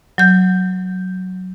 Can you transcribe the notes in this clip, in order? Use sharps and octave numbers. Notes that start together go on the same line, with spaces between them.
F#3 G6